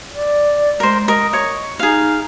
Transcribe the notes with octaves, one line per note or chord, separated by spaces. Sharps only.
D5
G#3 A#4 C5
A#4 D#5
C#5 C#6
D#4 G#4 F5